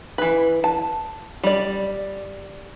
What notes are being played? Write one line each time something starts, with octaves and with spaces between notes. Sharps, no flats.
E3 B4
A5
G3 D5